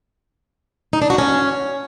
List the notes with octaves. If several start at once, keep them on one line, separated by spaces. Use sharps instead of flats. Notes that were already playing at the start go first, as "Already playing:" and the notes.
D#4
D4
F#4
C#4